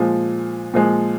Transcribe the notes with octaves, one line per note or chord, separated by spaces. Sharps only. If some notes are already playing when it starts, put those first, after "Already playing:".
Already playing: A#2 F3 G#3
A#2 F3 G#3